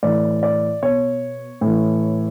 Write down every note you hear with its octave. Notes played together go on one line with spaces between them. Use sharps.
A2 E3 D5
D5
B2 C#5
A2 E3